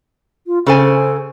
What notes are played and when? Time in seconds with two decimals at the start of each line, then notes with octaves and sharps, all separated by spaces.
0.47 F4
0.67 C#3 A4 C5 G#5